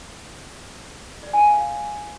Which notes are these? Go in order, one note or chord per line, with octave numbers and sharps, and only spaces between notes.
D5
G#5
F5
F5